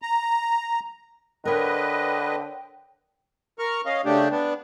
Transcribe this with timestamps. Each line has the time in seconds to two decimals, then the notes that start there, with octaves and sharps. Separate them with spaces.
0.02 A#5
1.45 D3 A#4 B4 C#5 D#5 G5
3.59 A#4 C#6 F6
3.86 C#4 D#5 F5
4.05 C#3 A3 D4 G4
4.31 B3 D4